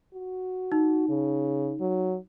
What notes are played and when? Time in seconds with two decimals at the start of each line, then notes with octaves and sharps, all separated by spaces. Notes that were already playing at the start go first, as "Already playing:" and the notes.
0.14 F#4
0.72 D#4
1.09 C#3
1.80 F#3